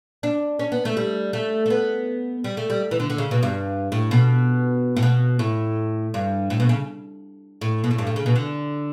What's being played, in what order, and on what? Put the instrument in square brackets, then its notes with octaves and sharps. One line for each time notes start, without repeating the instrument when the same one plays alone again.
[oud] D4
C#4
B3
A3
G3
A3
A3
B3
G3
A3
G3
E3
D3
D3
C#3
B2
G2
A2
B2
A2
B2
A2
G2
A2
B2
C#3
A2
B2
A2
G2
A2
C#3
B2
D3